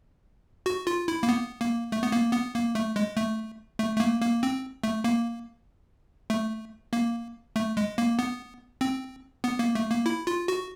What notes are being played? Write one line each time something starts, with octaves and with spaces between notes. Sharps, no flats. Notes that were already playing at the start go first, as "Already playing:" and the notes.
F#4
F4
E4
A#3
B3
A#3
A3
B3
A#3
B3
A#3
A3
G#3
A3
A3
A3
A#3
A#3
C4
A3
A#3
A3
A#3
A3
G#3
A#3
B3
C4
B3
A#3
A3
A#3
E4
F4
F#4